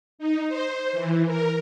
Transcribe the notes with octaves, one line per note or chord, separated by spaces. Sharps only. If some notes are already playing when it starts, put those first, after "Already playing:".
D#4
C5
E3
A#4